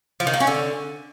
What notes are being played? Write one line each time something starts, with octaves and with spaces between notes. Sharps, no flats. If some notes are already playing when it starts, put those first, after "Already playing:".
F3
D#3
A#3
C#4
D3